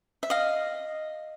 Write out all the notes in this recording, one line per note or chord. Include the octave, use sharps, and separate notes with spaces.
E5
D#5 F5